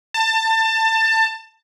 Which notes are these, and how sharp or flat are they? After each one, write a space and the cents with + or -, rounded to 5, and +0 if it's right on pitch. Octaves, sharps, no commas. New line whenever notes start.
A5 +25